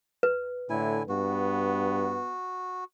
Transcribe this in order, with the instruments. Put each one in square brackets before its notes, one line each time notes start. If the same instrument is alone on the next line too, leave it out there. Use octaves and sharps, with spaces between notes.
[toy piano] B4
[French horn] A2 [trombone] D3 [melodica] E4 G#5
[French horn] G2 [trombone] B3 [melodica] F#4